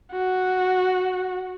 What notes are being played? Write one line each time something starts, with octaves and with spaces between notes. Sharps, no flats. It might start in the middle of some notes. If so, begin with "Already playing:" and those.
F#4